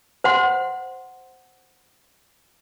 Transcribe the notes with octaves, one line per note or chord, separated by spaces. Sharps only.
C5 F#5 C6